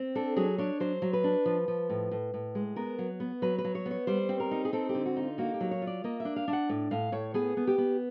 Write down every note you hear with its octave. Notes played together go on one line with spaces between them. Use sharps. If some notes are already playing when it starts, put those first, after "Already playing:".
Already playing: C4
D4 A4
F#3 G#4
D4 C#5
F#3 C5
F#3
B4
D4
F3
F3
A2
A2
A2
G#3
B3 A#4
F#3
B3
F#3 B4
B4
F#3
C#5
B3
C#5
G3 C5
C4
A#4
D#4
G#4
C4 A4
G4
D3
F#4
D#4
F4
A#3 F#4
G4
F#3
C#5
F4
D5
A#3 D#5
E5
D4
F5
D4
F#5
A2
A2 F5
A2 C#5
B3 G#4
B3
G4
B3